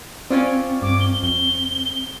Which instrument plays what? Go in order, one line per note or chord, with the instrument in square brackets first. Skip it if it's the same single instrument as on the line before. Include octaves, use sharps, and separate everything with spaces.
[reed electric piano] C4 [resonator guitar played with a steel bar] C#4 F4 D5
[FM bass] G2 [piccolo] D6
[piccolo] G7
[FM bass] F2 [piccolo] G7